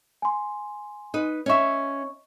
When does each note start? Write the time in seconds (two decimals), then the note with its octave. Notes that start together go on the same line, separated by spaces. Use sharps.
0.22 G#5 C6
1.14 D#4 B4
1.46 C#4 C#5 D#5 E5 C#6